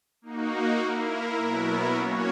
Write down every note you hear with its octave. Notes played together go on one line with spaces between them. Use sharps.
A#3 D#4 F#4
A#3 E4 A#4
B2 F#3 B3 E4 A#4
A#3 C#4 F#4 C#5